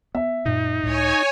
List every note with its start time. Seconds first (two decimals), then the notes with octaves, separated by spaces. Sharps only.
0.15 B3 E5
0.45 F#2 A#2 D#4
0.83 C#2 A2 C#5 G#5